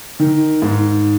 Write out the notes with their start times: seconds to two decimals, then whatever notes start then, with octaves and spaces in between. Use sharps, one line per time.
0.20 D#3
0.62 G#2